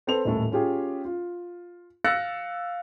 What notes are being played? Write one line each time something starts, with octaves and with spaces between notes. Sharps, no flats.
C4 A4 B4 C5 F7
D#1 A2 A4
C#4 F4 G4 G#4
F4
F5 E6 F#6 A6 A#6 C#7